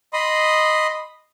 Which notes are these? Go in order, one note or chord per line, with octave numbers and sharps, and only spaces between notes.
D#5 B5 C6 D#6